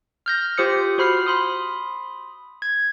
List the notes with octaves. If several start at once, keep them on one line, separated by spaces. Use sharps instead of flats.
F6 G6 A#6
F4 G4 C5 D#6 C#7
F#4 C5 B5 F6 C7
B5 C6 D#6
G#6